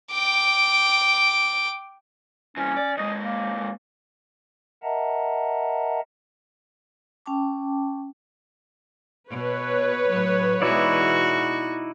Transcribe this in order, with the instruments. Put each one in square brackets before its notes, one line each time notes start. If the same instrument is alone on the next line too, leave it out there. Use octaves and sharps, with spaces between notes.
[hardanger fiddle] G5 D6
[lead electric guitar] G2 E3 [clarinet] C#4
[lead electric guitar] D5
[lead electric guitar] D#2 G#3 [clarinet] D#5
[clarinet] A#3
[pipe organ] A#4 D#5 E5 F#5 A5 A#5
[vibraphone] C#4 G5 A5 D6
[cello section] B2 [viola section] B4 C#5
[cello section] A2 F#3
[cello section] B2 E3 G#3 [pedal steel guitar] D#4 E4 D5 [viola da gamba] F#4